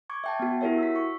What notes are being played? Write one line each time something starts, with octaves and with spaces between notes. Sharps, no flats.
C#6 D6 G#6
E5 G5 A5
B3 F#4
E4 F#4 G4 A#4 C#5 E5
E6 B6
C#6